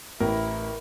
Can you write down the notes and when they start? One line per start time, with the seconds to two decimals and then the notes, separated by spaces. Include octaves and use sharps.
0.20 A1 E4 A#4